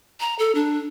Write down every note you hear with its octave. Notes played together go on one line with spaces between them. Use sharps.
A#5
A4
D4